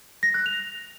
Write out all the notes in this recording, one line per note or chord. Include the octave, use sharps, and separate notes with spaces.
A#6
F#6
F7